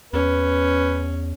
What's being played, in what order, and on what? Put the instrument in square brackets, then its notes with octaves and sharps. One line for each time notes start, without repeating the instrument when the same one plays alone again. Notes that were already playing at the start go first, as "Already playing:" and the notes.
[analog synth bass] E2 [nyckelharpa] C#4 [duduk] B4